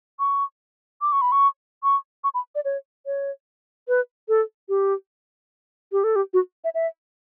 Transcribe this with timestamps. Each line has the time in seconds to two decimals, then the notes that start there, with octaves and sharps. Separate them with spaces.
0.19 C#6
1.01 D6
1.12 C#6
1.21 B5
1.32 C#6
1.84 C#6
2.24 C#6
2.34 B5
2.55 D5
2.65 C#5
3.06 C#5
3.88 B4
4.29 A4
4.69 G4
5.92 G4
6.04 A4
6.16 G4
6.33 F#4
6.64 E5
6.75 E5